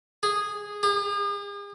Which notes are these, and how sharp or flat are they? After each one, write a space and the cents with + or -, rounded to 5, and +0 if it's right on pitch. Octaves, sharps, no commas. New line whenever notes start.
G#4 -10
G#4 -45